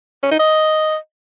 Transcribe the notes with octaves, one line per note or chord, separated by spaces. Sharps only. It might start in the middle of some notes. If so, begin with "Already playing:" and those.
C#4
D#4
D#5